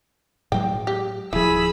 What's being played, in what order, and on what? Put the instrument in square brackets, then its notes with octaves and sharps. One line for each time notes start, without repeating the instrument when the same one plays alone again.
[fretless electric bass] A2 F#3 G#3 [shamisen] G5
[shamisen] G4
[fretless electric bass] D1 F3 [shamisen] E4 [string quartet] G#4 B5 E6